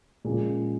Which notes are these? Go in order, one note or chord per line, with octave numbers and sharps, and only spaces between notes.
A#2 C#3 F3 G#3